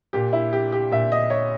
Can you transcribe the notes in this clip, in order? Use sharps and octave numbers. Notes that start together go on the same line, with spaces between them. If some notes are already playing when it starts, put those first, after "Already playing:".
A#2 G4
E4
G4
G4
A#2 E5
D#5
C#5